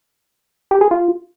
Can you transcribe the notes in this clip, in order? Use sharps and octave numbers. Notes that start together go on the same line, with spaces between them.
G4
G#4
F4